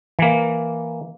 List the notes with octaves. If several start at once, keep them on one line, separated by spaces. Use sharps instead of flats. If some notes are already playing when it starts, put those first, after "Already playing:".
E3 A#3